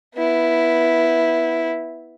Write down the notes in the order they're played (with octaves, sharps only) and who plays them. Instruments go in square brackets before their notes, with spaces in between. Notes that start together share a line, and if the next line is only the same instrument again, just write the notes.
[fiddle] B3 E4